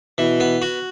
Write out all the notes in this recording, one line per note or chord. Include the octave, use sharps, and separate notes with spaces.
B2 E3
B3
F#4